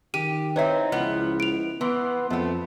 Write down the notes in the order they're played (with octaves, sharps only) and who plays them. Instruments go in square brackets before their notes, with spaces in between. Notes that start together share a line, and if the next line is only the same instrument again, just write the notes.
[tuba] D#3 [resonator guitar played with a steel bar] G4 [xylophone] D#7
[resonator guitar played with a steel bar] C4 D#4 [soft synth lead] E4 [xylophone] B4 C#5 E5
[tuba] C#2 [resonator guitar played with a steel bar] F3 B3
[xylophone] D7 F7
[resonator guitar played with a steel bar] E3 [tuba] B3 [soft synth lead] C6
[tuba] F2 [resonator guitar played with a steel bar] A3 B3